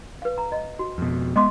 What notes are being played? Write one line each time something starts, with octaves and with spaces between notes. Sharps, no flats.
B4 F5
A#5
D#5
F#4
F2 B2
G#3 B3 D#5 C6 D6